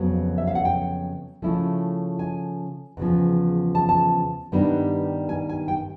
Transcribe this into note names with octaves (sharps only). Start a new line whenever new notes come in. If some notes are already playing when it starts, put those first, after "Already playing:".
Already playing: F2 C#3 F#3 B3
E5
F5
F#5
G5
C#3 F3 A3 C#4 E4
G#5
E2 C#3 F3
A5
A5
G2 D#3 G3 B3 D4
G#5
G#5
G5